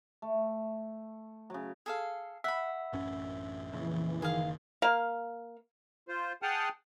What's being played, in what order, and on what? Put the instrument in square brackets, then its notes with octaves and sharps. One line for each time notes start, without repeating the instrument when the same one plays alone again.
[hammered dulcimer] A3
C#3 F#3
[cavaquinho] G#4 A4 F5
[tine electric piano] E5 [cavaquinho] F#5 B5
[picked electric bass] A1 F#2 C#4
[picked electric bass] F2 A#2 C#3 [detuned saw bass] E3
[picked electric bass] F#1 [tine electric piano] D#3 [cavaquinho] G#4 F5
[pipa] A#3 F5
[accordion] F4 C5
G#4 F#5 G5 A5 D#6 F6